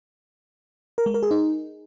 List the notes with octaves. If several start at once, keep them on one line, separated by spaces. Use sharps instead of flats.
A#4
G#3
A#4
G#4
D#4